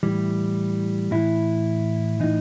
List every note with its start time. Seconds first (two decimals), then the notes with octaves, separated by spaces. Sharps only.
0.03 A2 E3 G3
1.11 A2 E3 E4
2.20 A2 E3 D#4